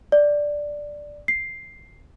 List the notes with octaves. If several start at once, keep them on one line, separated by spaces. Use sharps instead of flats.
D5
C7